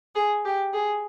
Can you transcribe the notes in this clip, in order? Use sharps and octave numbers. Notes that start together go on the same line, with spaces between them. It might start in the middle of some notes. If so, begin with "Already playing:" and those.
G#4
G4
G#4